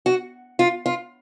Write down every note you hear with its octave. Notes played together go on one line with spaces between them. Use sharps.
F#4
F4
F4